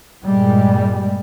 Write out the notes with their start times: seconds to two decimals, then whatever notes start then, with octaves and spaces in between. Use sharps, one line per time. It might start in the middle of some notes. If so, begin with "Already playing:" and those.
0.24 G2 A#2 G3 G#3